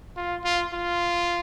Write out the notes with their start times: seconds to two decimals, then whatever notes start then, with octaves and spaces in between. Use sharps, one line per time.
0.17 F4
0.45 F4
0.73 F4